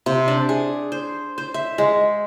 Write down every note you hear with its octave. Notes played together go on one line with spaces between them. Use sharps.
C3
D4
G#4
C5
C5
E5
G#3